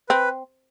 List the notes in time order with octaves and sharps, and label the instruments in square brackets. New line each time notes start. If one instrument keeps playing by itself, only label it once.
[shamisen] C4 [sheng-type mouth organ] B4